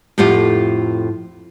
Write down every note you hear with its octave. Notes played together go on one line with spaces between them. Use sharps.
F2 A2 F4 G4 F#5